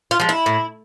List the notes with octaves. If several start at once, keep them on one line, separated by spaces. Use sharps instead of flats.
F4
F3 G#3
E4
A2